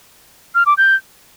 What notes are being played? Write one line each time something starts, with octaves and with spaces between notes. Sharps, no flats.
F6
D6
G6